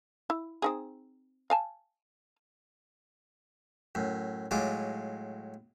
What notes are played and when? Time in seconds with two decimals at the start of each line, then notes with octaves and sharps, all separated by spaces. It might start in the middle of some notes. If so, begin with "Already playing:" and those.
0.30 E4
0.62 C4 D#4 G#4
1.50 F5 G#5 A5
3.95 F#2 A2
4.51 A2 F#3 G#3 F4 D6